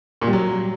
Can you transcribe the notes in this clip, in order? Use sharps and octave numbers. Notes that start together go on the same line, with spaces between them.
A#2
G3
F#3